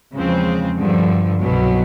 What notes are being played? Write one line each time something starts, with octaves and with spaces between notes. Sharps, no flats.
E2 C#3 F3 G#3 C4
G2 D3 F3
C2 B2 F#3